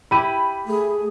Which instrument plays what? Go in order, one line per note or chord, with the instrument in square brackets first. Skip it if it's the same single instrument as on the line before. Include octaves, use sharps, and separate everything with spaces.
[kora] E4 G4 [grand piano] B5 D#7
[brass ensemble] A3 [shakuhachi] G#4